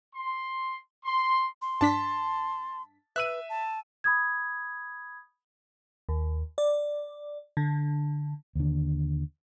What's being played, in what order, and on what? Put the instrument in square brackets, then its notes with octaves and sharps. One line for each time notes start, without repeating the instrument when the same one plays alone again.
[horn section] C6
C6
[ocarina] C6
[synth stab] G2 D4 B6 [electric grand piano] A5
[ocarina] B4 [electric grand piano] E5 E6 D#7 [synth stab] F#6
[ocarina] A5
[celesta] B5 D#6 G#6
[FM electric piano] D#2
D5
D3
[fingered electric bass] D#2 D3